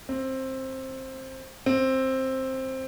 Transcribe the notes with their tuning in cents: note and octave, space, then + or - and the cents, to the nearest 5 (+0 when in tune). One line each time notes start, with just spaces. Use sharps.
C4 +15
C4 +10